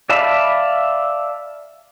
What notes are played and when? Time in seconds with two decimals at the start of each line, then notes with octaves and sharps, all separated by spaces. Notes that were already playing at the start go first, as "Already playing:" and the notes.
0.10 D5 E5 F5 A5 B5